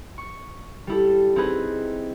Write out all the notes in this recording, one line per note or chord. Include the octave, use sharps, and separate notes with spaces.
C#6
G3 E4 A4
C4 D#4 E4 G#4 B4